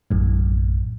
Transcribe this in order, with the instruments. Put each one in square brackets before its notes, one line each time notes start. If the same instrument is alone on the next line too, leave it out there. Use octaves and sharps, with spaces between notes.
[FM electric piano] A#1 F#2 A2